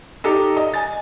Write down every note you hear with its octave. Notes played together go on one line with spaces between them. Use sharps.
D#4 G4 A4 D#5
D#5
G#5 A6